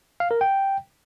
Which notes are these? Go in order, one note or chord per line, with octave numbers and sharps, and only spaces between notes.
F5
A#4
G5